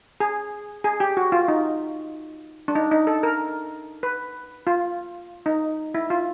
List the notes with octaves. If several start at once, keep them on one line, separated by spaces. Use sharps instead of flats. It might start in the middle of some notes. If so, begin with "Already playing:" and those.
G#4
G#4
G4
F#4
F4
D#4
D4
D#4
D#4
A4
A#4
B4
F4
D#4
E4
F4